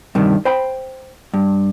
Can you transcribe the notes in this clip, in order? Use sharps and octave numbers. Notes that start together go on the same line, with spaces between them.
G2 C3 D#3
C5 G5 B5
G2